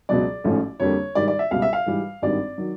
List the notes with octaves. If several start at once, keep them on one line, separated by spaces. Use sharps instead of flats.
C#2 B2 F#3 D5
A1 G#2 F3 A3 C#4
F2 D3 G3 A#3 C#5
G#2 D#3 G3 D5
D5
E5
C#2 B2 G3 F5
E5
F5
G#2 E3 G3
G#1 G2 D#3 G3 D5
D#3 F#3